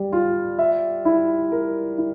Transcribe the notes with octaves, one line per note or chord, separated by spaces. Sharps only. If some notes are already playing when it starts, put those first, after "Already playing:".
Already playing: G3
F4
E5
E4
A#4
E4